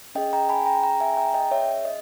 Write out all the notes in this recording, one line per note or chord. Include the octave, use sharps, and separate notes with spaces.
C#4 G#4 D#5 G5
G5 A#5
G#5 B5
G5 A#5
G5 A#5
E5 G#5
G5 A#5
D#5 G5
C#5 E5
D#5